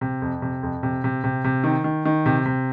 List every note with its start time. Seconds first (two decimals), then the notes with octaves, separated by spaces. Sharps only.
0.01 C3
0.22 F2
0.42 C3
0.63 F2
0.83 C3
1.04 C3
1.24 C3
1.44 C3
1.64 D#3
1.84 D#3
2.05 D#3
2.26 C3
2.46 C3